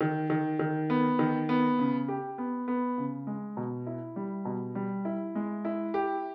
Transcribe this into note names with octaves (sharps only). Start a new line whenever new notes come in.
D#3
D#3
D#3
B3
D#3
B3
C#3
G4
B3
B3
C#3
G#3
B2
E4
G3
B2
G3
E4
G#3
E4
G4